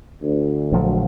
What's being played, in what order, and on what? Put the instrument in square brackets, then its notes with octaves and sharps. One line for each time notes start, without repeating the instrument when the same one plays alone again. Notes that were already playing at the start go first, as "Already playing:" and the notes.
[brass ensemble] D2
[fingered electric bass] A#1 F3 F#3